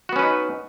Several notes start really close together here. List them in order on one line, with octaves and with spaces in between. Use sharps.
F#4 B3 C#4 B4 D#4